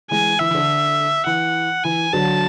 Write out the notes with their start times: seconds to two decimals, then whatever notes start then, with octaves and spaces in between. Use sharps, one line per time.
0.11 E3 G#3 G#5
0.40 E3 E5
0.50 E3
0.55 D3
1.26 E3 F#5
1.84 E3 G#5
2.13 D3 F#3 A5